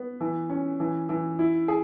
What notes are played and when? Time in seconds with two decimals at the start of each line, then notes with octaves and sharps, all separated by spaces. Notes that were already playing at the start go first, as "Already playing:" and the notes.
Already playing: B3
0.21 E3
0.50 C#4
0.80 E3
1.09 E3
1.39 E4
1.68 G#4